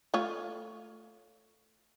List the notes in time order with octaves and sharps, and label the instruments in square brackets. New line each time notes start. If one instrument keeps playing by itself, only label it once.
[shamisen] A3 F4 C#5